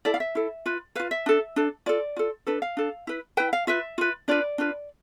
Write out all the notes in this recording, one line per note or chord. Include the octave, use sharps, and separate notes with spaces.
E4 A4 D5
F5
E5
E4 A4
F4 B4
F4 B4 F5
E5
D4 A4
D4 A4
F4 A4 D5
F4 A4
D4 A4 B4
F5
D4 A4
E4 B4
E4 B4 G5
F5
F4 B4 E5
F4 B4
D4 F4 B4 D5
D4 F4 B4